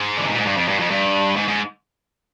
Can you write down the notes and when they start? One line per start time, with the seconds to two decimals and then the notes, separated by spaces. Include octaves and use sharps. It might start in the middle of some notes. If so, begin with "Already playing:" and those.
Already playing: G#2
0.17 D3
0.24 C3
0.31 A#2
0.38 G#2
0.46 G2
0.56 F2
0.68 G2
0.79 F2
0.90 G2
1.36 G#2
1.48 G#2